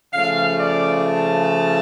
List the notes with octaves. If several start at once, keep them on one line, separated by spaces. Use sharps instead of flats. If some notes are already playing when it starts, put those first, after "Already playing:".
C#3 F3 A3 F5
D5
A5